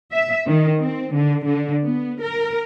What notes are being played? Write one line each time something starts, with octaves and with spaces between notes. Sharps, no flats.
E5
D#3
C4
D3
D3
B3
A#4